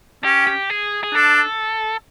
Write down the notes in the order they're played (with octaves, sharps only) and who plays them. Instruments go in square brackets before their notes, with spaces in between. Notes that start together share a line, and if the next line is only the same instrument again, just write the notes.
[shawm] C#4 [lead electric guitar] G4
[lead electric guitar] G4
G#4
G#4
[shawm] D4 [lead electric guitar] A4